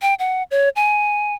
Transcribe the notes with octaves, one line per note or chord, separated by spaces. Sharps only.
G5
F#5
C#5
G#5